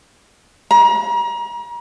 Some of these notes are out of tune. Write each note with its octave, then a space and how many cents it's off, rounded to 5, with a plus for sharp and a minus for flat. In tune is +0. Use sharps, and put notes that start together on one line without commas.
A#5 +35